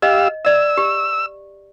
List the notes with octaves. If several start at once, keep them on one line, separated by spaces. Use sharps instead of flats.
G4 D#5 F5 E6
D5 E5 E6
G4